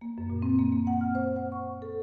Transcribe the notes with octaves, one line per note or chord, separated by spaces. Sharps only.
A#3
F#2
A#2
C4
A#3
A#3
F#5
F6
C5
F#5
C#6
A4